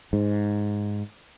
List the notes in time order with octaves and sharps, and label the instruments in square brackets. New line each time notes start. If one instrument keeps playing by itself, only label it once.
[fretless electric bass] G#2